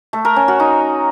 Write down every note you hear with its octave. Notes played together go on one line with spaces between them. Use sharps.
A3
A#4
C#4
F#4
D#4